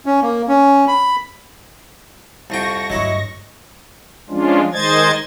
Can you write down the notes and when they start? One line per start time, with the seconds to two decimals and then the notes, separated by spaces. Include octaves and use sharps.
0.06 C#4
0.22 A#3
0.48 C#4
0.88 B5
2.50 C2 F2 G5 C#6 A#6
2.90 D2 G2 F#3 E4 D#5
4.30 F3 G#3 C#4 D4 F4
4.73 D#3 G#3 C5 D#5 G#6 A6